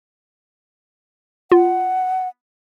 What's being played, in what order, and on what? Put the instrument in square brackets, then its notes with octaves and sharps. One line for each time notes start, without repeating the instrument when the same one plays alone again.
[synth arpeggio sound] F4 [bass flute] F#5